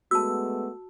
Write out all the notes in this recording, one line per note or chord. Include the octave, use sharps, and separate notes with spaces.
G#3 A3 B3 F#4 A5 E6